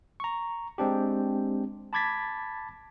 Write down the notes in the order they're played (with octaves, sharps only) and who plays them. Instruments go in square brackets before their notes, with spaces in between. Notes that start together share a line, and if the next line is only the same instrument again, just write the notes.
[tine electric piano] A#5 C#6
G#3 C4 D4 G4
A5 B5 D6 G#6 A6 B6